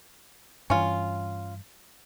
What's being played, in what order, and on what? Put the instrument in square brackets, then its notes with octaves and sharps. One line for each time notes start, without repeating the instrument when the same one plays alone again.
[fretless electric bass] G2 E3 [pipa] C#4 F4